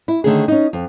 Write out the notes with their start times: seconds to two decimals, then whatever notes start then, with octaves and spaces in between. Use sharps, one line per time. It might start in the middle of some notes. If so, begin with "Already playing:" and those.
0.08 E4
0.24 D3 D#3 F3 A3 C#4 G#4
0.48 C#4 D#4
0.73 F2